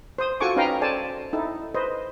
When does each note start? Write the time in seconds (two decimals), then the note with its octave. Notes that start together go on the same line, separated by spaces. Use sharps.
0.18 C5 D#6
0.40 F4 F#4 A4 G#5 C#6 D6
0.56 C#4 D#4 B4 F5 G5 A#5
0.81 A4 C5 D5 G#5 A5
1.33 D#4 E4 A4
1.75 B4 C5 D#5